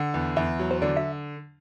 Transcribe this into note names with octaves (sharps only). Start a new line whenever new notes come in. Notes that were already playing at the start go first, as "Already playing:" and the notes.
Already playing: D3 F#5
E2
E2 E5
F#3
C5
D3 D5
E5